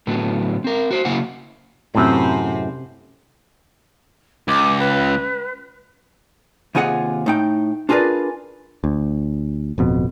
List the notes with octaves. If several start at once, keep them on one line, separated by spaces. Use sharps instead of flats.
A2 D3 F#3 B3
C4 A#4
F#4 C5
C#3 F#3 A#3 E4 F#5
F#2 A2 C3 C4
C#2 D6
B4
D#2 C3 F4 G#4 D#5 F#5
A2 D#4 G5
D4 F4 G#4 A#4 B4 D5
D2
D1 F2 B2